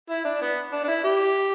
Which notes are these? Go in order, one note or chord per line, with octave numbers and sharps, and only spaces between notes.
E4
D4
B3
D4
D4
E4
G4